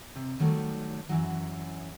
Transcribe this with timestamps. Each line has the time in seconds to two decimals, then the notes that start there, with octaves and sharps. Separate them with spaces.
0.16 C3
0.39 D#3 F#3 G3 A3
1.09 F#2 E3 F#3